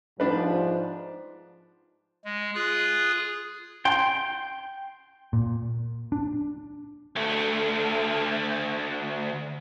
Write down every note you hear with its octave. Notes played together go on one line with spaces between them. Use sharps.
G#2 F3 G3 D4 B4
G#3
F4 G#4 D#6 F#6
G5 C6
A#2
D4
D2 A3